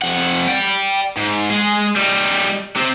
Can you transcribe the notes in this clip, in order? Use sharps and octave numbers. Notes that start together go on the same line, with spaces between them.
F2 F#5
D5 G5
G#2
G#3 G#4
G3 D#4
C3 C4